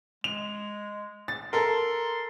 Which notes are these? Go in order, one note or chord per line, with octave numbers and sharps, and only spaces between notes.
G#3 F7
A6
A4 A#4 C6